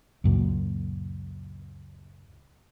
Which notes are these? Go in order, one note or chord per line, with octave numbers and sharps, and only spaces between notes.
C#2 F#2 A#2